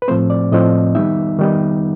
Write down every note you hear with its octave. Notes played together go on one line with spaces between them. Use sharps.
B4
A2 F3 A3 C4 C5
D5
A2 F3 A3 C4 D#5
D#3 G3 B3 D#4 E5
D#3 G3 B3 D#4